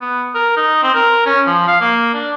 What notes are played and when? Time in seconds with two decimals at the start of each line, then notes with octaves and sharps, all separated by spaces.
0.01 B3
0.35 A#4
0.57 D#4
0.83 C4
0.95 A#4
1.26 C#4
1.47 F3
1.68 F5
1.81 A#3
2.14 D4